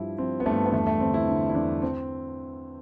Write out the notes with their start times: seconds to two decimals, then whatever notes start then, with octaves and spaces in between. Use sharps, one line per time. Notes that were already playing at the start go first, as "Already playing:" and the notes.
Already playing: G2 F3 G3 E4
0.18 F3 C4
0.40 B3
0.46 G2 A3
0.66 B3
0.73 E2 A3
0.87 A3
1.00 D3 C4
1.14 E4
1.28 D3
1.49 E4
1.55 E2 D4
1.82 C4